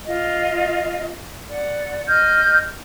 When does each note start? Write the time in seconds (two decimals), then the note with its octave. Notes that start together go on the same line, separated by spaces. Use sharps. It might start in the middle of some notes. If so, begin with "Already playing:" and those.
0.06 F4 D#5
1.49 D5 F#5
2.06 D#5 F6 G6